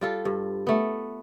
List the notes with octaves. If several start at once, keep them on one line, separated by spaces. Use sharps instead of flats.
G3 F4 A4
G2
A3 B3